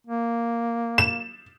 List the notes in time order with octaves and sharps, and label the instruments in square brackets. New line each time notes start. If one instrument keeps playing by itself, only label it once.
[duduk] A#3
[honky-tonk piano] E7